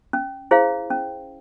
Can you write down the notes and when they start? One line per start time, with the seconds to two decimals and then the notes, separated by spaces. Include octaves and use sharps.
0.13 C#4
0.51 E4 G#4 C5 F5
0.90 C#4